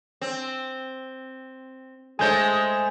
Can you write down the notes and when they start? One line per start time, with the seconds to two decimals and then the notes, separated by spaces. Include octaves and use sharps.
0.21 C4
2.19 G#3 A3 C5 G#5 G6